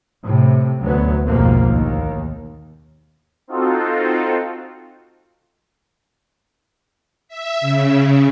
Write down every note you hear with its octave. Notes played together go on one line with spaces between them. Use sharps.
A2 C3
D2 F#3 B3
B1 F2 G#2 B2 F3 A#3
D#2
C4 D#4 F4 F#4 A4
E5
C#3